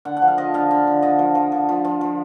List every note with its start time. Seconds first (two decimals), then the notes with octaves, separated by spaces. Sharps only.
0.05 D3 F#5
0.17 F#5
0.22 F3
0.28 F5
0.38 F3 D#5
0.54 D3 F5
0.71 D3
0.87 D3
1.02 D3 D#5
1.19 F3
1.35 F3
1.52 D3
1.69 F3
1.85 F3
2.01 F3